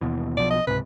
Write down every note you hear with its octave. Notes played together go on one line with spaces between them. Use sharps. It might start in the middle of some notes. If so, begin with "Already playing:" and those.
D#2 B2 E3
B1 B2 F3 D5
D#5
C#2 G#2 C3 B4